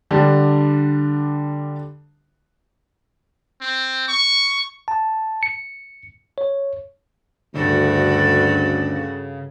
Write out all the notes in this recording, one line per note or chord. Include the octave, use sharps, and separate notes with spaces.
D3 G3 D4
C4
C#6
A5
C#7
C#5
D2 G2 C#3 F#4 A4